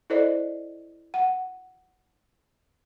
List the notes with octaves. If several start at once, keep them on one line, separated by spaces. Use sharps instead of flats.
E4 A4 C5 D5 D#5
F#5